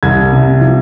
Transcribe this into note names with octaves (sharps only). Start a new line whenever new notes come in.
C2 G#6
C3
F3